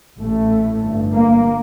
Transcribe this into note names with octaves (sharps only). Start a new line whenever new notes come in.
A1 A2 A3
G1 G2
A#3